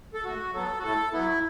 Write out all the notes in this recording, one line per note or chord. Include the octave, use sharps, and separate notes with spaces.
A4
A2 F#4
F#3 B3 A4
F#4
A2 A4
F#3 B3 E4